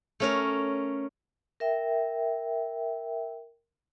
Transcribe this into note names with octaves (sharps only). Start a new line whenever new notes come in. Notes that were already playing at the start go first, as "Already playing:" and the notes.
A3 C#4 A#4
A#4 E5 G5